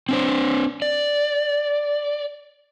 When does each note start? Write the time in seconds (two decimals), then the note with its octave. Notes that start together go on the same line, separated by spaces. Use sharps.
0.09 C4 D4 C5
0.82 D5